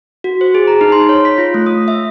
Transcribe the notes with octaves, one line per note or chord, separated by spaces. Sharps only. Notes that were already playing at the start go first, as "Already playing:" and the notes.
F#4
C5
G#4
A#5
D#4
C6
C#5
B6
F4
A3
D#6
E5